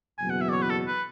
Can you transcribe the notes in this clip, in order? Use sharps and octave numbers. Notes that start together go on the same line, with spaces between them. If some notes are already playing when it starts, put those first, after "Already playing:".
F#1 E2 B2 F#3 G#5
F#5
E5
D5
C#5
B4
A4
B4